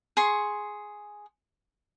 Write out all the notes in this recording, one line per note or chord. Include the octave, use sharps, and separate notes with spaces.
G#4 C6 C#6